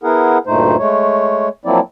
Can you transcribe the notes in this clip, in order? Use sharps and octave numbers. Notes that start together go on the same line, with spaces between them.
B3 E4 G#4 A#4 F#5
D2 G2 A#2 A3 D#4 C5
G#3 A3 C#5
F3 F#3 A#3 C4 E4 D5